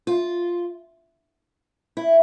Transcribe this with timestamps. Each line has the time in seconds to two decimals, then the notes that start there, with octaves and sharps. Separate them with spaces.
0.07 F4
1.97 E4